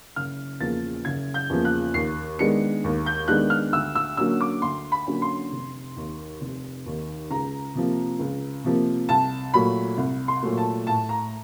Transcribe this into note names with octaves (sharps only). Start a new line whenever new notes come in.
F#1 F6
E2 C#3 F3 A#3 A6
F#1 G#6
G6
E2 C#3 F3 A#3
F#6
D#2 C7
D#3 G#3 B3 D4 C#7
D#2
G6
D#3 G#3 B3 D4 F#6
F6
D2 E6
E6
D3 F#3 A#3 C#4 E6
D6
D2 C6
B5
D3 F#3 A#3 C#4
C6
F1
D#2 D#3
F1
D#2 D#3
C#2 A#5
C3 F3 A#3
C#2
C3 F3 A#3
C2 A5
A#2 F#3 A3 B5
C2
C6
A#2 F#3 A3
A5
A2 A5
A#5